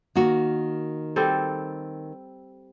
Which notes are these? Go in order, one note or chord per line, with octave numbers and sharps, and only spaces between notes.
D#3 A#3 F#4
G3 C4 A4